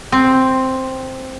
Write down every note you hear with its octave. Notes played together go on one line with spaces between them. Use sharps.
C4